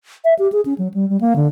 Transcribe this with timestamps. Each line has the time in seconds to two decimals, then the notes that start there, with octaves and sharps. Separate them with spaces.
0.24 E5
0.39 G4
0.52 G#4
0.66 C#4
0.78 F#3
0.94 G3
1.10 G3
1.21 A#3
1.36 D3